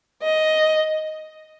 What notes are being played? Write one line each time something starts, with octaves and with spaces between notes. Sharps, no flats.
D#5